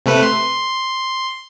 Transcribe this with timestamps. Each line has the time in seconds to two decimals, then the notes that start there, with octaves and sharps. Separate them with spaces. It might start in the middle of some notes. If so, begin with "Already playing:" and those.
0.06 C3 A3 B4
0.23 C6